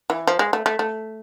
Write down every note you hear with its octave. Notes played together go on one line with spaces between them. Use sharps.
E3
F3
G#3
A3
A3
A3